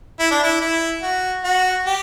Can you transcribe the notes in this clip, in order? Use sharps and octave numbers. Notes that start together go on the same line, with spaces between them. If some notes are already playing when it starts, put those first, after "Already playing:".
E4
D4
E4
E4
F#4
F#4
G4